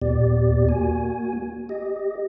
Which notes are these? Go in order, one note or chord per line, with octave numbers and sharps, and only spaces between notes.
D#2 A#2 B3 G4 D5
A#3 F#4 G#5
G4 D#5